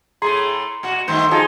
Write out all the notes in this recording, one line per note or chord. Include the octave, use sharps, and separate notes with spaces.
A2 A3 G#4 A#5 C6 C7
A#2 F#4
G2 D#3 A3 C5
F3 D#4 G#4 A5